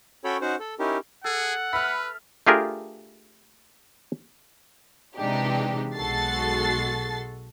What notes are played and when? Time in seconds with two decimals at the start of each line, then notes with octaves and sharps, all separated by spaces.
0.24 C#4 F#4 A4 C#5 G5 B5
0.41 C#4 D#4 F#4 C5 F#5
0.59 A4
0.79 C#4 D#4 E4 G4 A#4
1.24 G#4 A4 F#5
1.73 B4 E5 B5 F6
2.47 A3 D4 F4 G4 G#4 A#4
5.16 C3 E3 G#3 D4 D#4 G4
5.96 B1 G#3 F#4 A4 A6 C7